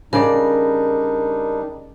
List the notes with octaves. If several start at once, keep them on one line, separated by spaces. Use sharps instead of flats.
C#3 G3 D4 D#4 A#4 D5